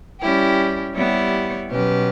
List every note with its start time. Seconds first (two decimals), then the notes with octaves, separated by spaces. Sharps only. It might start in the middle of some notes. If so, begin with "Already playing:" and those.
0.21 G3 C#4 E4 G4
0.94 G3 B3 E4 G4 C#5
1.69 B2 F#3 C#4 G4 B4